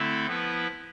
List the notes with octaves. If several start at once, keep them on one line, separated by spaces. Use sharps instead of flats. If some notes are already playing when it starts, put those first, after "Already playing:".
Already playing: D3 A3 C4 E4 A4
F3 B3 E4 B4